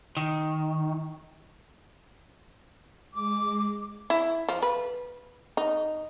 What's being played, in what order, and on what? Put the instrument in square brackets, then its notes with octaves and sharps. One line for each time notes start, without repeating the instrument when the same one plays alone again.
[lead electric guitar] D#3
[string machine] G#3 [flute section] D6
[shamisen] E4
F3
B4
D#4